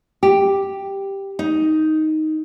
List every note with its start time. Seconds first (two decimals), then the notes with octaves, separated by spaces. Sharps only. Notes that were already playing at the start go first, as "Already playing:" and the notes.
0.23 G4
1.39 D#4